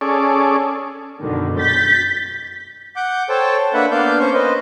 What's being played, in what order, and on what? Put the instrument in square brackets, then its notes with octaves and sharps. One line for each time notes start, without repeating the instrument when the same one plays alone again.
[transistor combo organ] C#4 G#4 A4 D5
[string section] F#2 B2 D3 D#3
G6 A6 B6
[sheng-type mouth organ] F#5 D6 G6
A4 C5 C#5 G5 A5
A#3 D4 B4 E5 F#5 B5
A#3 B3 D4 D5 F5 G6
A#3 C#4 C5 C#6 G6
B4 C5 D#5